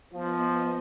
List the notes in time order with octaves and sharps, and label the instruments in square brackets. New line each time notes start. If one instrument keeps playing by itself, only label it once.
[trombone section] F3 [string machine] B3 D#5